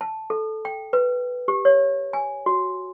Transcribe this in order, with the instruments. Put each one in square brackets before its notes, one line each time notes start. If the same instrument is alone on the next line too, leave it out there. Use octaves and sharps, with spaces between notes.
[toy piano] A5
A4
G5
B4
G4
C#5
G#5
F#4